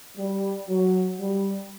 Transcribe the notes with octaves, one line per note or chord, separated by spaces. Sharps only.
G3
F#3
G3